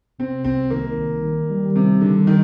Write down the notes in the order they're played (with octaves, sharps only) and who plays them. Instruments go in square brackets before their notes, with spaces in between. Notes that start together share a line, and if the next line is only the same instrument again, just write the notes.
[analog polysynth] C3 [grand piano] C4
[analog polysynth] C2 [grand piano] C4
[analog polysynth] D#3 [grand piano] A#3
[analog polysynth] C2
D#3
G3
[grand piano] C3 [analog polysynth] G3
[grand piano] D3 [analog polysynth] G3
[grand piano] D#3